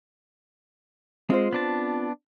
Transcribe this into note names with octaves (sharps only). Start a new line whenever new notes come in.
G#3 C4 F4 C5
B3 D4 A5